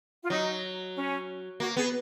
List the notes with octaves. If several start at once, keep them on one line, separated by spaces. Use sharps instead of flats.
F4
F#3 D#4
C#4
A#3 F#4
B3 G#4